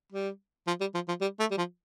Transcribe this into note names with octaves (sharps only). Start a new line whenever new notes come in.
G3
F3
G3
F3
F3
G3
A3
G3
F3